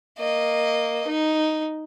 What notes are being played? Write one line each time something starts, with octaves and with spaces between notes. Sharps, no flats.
A#3 D#5
D#4